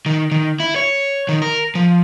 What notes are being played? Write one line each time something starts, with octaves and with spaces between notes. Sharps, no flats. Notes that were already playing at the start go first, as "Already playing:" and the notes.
D#3
D#3
E4
C#5
D#3
A#4
F3